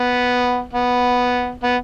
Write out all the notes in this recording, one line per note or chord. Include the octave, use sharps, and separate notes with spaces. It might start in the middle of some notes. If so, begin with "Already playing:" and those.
Already playing: B3
B3
B3